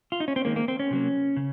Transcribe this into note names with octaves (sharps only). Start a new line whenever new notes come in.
F4
D#4
C#4
C4
D#3 G#3 A#3
A#3
C4
C#4
C3 F#3 A#3
C#3